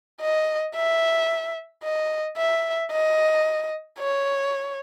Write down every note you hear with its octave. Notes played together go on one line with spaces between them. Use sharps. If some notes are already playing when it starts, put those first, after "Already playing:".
D#5
E5
D#5
E5
D#5
C#5